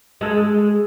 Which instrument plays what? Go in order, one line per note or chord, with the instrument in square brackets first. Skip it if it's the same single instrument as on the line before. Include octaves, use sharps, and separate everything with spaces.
[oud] G#3 A4